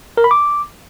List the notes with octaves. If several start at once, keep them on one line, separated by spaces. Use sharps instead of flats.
A#4
B5
D6